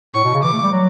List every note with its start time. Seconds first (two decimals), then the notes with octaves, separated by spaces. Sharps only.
0.14 A2 C#6
0.24 B2
0.34 C#3
0.43 E3 D6
0.53 A3
0.63 G3
0.71 F#3